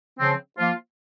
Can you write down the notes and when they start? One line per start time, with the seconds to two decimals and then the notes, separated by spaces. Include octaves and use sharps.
0.19 C#3 F3 C4
0.57 F3 A#3 F4